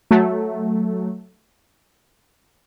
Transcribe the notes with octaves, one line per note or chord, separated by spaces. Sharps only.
F#3 A3